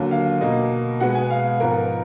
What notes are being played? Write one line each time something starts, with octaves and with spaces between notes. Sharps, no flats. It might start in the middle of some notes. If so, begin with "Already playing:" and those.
Already playing: D#2 D3 F#3 A#3
F5
B2 A#3 D#5
B2 G#3 B3 F#5
G#5
F5
G#2 F3 B3 A#4